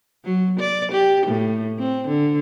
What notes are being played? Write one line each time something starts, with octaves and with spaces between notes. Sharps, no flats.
F#3
D5
G4
A2
C4
D3